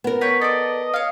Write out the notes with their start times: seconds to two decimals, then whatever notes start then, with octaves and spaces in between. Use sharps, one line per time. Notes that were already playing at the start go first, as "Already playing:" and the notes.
0.04 B3 A#4
0.21 B4 C#5 G5
0.41 A4 D5 D#5
0.94 C#5 F5